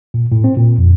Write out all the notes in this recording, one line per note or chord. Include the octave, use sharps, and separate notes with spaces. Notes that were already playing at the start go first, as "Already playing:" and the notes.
A#2
A2
C4
A#2
F2